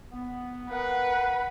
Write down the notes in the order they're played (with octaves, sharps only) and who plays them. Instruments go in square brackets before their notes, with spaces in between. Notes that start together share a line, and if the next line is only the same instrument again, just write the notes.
[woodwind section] B3
[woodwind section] A#4 F5 F#5 [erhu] B4